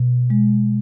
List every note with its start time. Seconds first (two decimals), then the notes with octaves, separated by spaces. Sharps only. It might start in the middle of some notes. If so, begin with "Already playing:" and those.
Already playing: B2
0.30 G#3